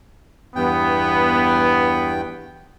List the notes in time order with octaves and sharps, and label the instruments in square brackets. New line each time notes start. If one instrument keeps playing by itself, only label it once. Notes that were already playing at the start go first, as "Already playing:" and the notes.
[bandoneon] E2 G2 G5 [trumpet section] B3